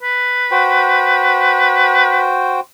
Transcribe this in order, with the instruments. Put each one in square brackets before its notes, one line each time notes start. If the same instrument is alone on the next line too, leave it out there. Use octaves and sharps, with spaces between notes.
[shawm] B4
[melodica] F#4 C5 G5